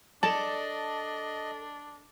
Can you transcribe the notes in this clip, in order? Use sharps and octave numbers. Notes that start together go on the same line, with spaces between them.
D4 A4 D5 D#5 A5